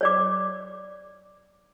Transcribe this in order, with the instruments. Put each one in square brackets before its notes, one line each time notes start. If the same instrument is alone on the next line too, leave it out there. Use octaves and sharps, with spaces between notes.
[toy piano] C#5 D5 D6